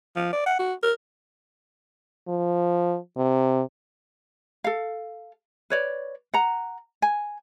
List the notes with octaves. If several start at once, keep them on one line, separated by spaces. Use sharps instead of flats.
F3
D5
F#5
F#4
A#4
F3
C3
A4 F5
B4 C#5 D5
F#5 A#5
G#5